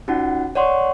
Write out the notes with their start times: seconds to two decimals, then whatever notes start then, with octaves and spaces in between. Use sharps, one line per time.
0.08 C#4 D#4 F4 F#4 F#5
0.55 C#5 D5 F#5 C6 C#6